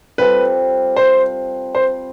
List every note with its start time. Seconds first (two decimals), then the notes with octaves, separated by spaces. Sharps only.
0.18 G3 C4 F4 A4 B4
0.96 C5
1.75 C5